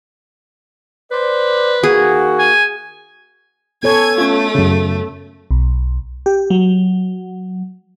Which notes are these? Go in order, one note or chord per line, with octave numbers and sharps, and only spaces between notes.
B4 C5 D5
D#3 A#3 F#4 G#4
G#5
B3 A4 C#5 G#5 G#6
A3 C#4 F4
F#2 C#3
B1
G4
F#3